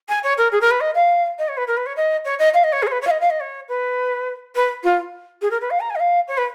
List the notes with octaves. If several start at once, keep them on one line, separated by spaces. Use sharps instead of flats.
G#5
C#5
A#4
G#4
A#4
B4
D#5
F5
D#5
C#5
B4
A#4
B4
C#5
D#5
C#5
D#5
F5
D#5
C#5
G#4
C#5
B4
C#5
F5
D#5
F5
D#5
C#5
B4
B4
F4
G#4
A#4
B4
F5
A#5
G#5
D#5
F5
C#5
B4